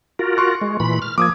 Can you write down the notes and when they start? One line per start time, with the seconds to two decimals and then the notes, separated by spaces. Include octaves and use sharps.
0.19 F4 F#4 A#4
0.37 C6 C#6 F#6
0.61 G#3
0.80 A#2 E3 B5
1.02 F6
1.18 F3 A#3 D6 D#6 G#6